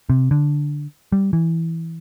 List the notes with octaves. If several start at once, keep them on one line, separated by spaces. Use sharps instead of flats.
C3
D3
G3
E3